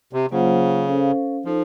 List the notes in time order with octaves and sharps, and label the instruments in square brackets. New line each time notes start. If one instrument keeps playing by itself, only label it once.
[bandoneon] C3
[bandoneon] C#3 [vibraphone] F#3 A#3 F4 C5 F#5
[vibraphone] C#4 A4 C5 F5
[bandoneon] F3 [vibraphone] D#4 A4 C5